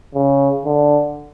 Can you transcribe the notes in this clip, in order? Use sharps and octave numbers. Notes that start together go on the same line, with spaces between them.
C#3
D3